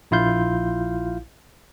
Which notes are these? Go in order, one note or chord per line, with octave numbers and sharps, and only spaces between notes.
A#1 E4 F4 F5 G6